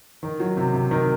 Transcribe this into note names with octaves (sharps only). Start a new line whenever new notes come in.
D#3
F#3
C3
C3
D#3